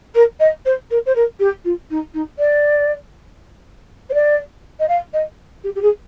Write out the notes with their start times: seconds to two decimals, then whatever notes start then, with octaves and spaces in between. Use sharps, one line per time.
0.14 A#4
0.40 D#5
0.65 C5
0.90 A#4
1.06 C5
1.15 A#4
1.39 G4
1.64 F4
1.90 D#4
2.13 D#4
2.39 D5
4.09 C5
4.14 D5
4.79 D#5
4.88 F5
5.13 D#5
5.64 G4
5.75 G4
5.82 G#4